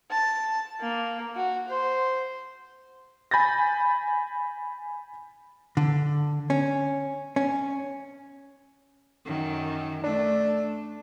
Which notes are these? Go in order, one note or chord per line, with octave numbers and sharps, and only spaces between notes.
A5
A#3
F#4
C5
G#5 B5 G6 A6 A#6
D3
C#4
C#4
F#2 D#3
A3 D4